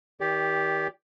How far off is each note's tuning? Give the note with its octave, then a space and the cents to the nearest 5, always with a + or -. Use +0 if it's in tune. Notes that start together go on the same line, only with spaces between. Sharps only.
D#3 +30 G4 +5 D5 -35